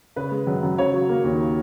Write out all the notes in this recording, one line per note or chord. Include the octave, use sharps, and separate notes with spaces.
C#3 B4
G#3
F#2
F#2
C#3 C#5
F#3
A#3
D#2